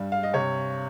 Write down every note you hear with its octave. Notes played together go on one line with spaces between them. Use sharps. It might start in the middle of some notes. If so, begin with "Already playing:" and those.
Already playing: G2 G3
F5
D#5
C3 C#5